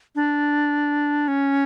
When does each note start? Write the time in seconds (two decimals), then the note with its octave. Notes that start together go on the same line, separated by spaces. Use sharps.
0.15 D4
1.28 C#4